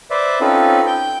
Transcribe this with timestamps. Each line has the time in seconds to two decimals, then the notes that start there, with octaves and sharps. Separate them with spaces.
0.11 B4 C5 D5 E5
0.41 C4 C#4 D#4 F4 A4 B4
0.86 G5 G6